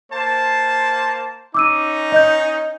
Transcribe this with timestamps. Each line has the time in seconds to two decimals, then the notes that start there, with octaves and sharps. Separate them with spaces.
0.11 A#3 C5 A5
1.54 C#4 D#4 D6 E6 D#7
2.12 D#5 G6